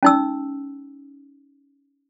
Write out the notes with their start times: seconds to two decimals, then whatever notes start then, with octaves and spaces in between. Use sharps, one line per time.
0.03 C#4 D#4 E6